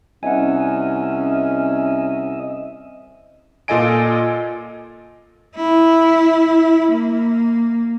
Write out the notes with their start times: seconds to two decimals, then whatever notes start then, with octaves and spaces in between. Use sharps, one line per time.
0.23 C2 C#4 D#5 E5 F#5 G#5
3.68 A#2 F4 A4 D#5 G#5 D7
5.56 E4
6.91 A#3